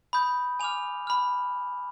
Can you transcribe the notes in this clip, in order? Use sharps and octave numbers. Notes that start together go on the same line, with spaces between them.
B5 D#6 G6
G#5 D6 F6 F7
B5 F6